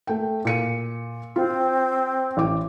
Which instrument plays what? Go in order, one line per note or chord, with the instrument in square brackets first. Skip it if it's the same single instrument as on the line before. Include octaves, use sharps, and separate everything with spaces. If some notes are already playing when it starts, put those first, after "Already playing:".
[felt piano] A3 G5
A#2 C#7 D#7
[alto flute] C4 [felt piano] F4
[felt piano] A1 D6